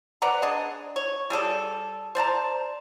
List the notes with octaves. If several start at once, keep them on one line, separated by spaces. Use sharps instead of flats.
B4 D5 F#5 A#5
D4 G#4 D#5
C#5
G3 G#4 A4 D5
C5 D5 A5 A#5